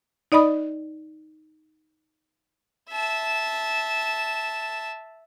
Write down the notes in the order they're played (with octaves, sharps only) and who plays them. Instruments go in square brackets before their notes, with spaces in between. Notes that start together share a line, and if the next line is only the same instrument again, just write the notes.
[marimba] D#4 D5 D#5 B5 D#6
[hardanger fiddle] E5 A5